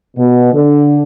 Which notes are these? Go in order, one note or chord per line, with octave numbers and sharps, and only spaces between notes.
B2
D3